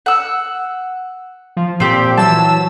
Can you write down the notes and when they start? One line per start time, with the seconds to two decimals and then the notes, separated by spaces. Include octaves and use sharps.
0.06 F#5 E6
1.57 F3
1.80 A#2 F3 C4 G4
2.17 E3 F#3 A5 E6